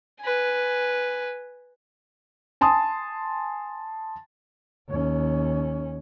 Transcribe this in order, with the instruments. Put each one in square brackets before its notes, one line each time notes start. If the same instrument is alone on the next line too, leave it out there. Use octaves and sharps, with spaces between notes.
[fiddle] B4 G#5
[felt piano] G#5 A5 C6 D#6
[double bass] D#2 C#4